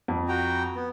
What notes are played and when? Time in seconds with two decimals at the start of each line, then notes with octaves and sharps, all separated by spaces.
0.08 F2
0.28 F#4 G5 A#5
0.76 B3